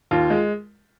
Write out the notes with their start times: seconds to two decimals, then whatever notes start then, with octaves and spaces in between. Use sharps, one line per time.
0.11 D#2 F4
0.30 G#3